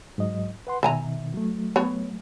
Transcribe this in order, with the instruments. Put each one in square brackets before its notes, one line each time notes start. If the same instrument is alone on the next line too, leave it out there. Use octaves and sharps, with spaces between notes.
[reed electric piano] G#2 F#3 D#5
B4 F#5 C6
[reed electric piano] B2 D#3 [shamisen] E5 G#5 A#5
[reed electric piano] F#3 A3
[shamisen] B3 C#5